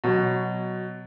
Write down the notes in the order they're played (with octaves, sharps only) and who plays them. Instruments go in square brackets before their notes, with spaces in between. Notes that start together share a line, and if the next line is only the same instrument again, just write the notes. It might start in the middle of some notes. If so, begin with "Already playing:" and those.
[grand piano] B2 F#3